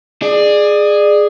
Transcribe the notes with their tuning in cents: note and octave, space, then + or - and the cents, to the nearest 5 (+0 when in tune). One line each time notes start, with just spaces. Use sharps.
G#4 +0 D5 +25